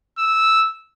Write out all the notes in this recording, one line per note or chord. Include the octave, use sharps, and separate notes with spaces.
E6